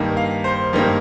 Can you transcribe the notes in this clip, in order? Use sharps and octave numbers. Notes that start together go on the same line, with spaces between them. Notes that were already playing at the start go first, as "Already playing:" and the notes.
Already playing: G2 D#3 A#3
F5
C5
G2 D#3 A#3